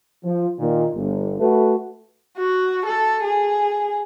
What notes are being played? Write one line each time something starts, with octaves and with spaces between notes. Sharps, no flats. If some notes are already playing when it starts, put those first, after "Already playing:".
F3
A#2 D#3
G1
A3 F#4 B4
F#4
A4
G#4